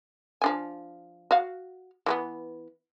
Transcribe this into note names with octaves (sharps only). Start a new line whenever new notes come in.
F3 D4 G#5
F#4 F5
E3 G#3 B3